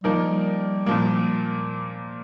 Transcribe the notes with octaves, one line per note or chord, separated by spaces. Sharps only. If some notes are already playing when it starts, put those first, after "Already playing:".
F3 G3 A#3 D#4 A#4
A#2 F3 A#3